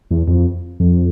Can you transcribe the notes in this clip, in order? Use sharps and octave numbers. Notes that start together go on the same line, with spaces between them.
E2
F2
F2